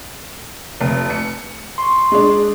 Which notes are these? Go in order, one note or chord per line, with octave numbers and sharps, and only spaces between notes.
F1
C#7
C6 C#6
G#3 D4